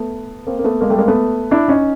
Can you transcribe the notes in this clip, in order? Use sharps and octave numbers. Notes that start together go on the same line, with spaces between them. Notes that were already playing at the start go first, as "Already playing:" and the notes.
Already playing: A3 B3
A#3 C4
A#3
A3 B3
G#3 A#3
G3 A3
G#3 A#3
A3 B3
D4 E4
C#4 D#4